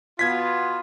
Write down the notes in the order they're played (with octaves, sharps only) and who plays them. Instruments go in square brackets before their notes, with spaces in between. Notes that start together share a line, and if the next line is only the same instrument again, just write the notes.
[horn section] B2 B3 F4 [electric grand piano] G#6 B6